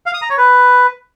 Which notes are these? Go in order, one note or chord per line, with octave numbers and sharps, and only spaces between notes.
F5
D#6
A#5
C#5
B4